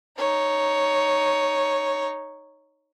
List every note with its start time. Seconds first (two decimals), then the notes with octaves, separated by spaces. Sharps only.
0.18 D#4 C#5